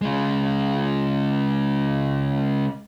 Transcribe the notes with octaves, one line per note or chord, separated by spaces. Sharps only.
C#3 G#3